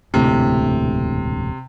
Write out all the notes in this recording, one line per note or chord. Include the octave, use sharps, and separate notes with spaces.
E1 D2 A2 C3